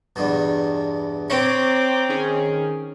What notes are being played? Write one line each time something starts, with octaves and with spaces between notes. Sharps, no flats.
E2 G2 B2
C4 C#5 A#5 D6
D#3 C#4 G#4